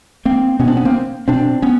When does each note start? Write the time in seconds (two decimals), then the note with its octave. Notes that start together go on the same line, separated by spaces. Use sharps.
0.25 A#3 C4
0.59 B2 B3 C#4
0.68 C4 D4
0.77 B3 C#4
0.85 A#3 C4
1.28 B2 C4 D4
1.62 B3 C#4